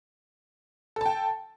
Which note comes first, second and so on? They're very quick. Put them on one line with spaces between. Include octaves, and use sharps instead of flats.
A4 A5 G5